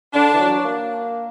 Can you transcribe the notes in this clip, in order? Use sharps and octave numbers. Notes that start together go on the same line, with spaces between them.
D3 D4
E3
F#3
A#3